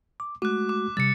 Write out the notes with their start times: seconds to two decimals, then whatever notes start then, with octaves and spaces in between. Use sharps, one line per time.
0.20 D6
0.42 G#3 A3 F#4 D6 F#6
0.69 D6
0.97 C3 G3 A6 C#7